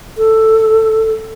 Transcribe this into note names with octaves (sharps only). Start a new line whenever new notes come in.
A4